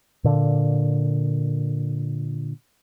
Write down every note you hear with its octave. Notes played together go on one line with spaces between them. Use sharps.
A#2 D3